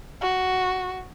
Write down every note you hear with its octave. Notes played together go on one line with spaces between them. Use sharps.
F#4